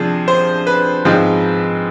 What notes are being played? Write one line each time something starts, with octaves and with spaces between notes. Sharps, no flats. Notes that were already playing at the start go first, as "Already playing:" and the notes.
Already playing: C3 F3 D4 G#4
C5
B4
G#2 F3 G#3 C4